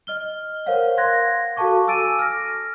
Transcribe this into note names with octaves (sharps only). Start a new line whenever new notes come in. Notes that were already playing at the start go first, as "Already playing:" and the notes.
D#5 F6 G7
A#4 C5 C#5 F5 F#5
F5 F#5 C6 F#6 G#6 A#6
F#4 A4 F5 A5 C#6 D6
G#5 D6 E6 A6 D7 D#7
F6 A#6